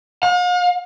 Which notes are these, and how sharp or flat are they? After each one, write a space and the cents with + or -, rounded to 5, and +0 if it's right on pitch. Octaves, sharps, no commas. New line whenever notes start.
F5 +45